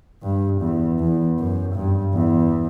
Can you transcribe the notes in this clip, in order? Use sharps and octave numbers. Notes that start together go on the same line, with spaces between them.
G2
E2
E2
F#2
G2
E2